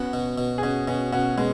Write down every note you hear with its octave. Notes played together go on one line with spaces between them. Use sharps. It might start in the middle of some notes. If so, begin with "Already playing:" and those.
Already playing: B3 C#4 F#4
B2
B2
G#4
B2 C#4 F#4
B2 C#4 F#4
B2 C#4 F#4
B2 G#3 C#4